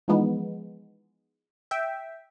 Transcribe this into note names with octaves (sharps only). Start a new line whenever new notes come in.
E3 F3 G#3 B3 D#4
E5 G5